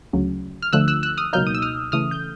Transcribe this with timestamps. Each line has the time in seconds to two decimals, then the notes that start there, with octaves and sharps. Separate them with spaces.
0.13 D2 C#3 F#3
0.62 F6
0.73 D2 D3 F3 A3 E6 F#6
0.88 E6 F#6
1.03 E6 F#6
1.17 D#6 F6
1.33 C#2 B2 F#3 A#3 D#4 F6 G6
1.47 D#6
1.55 E6
1.62 D#6 F6
1.92 C#3 E3 A3 D#6 F6
2.11 G6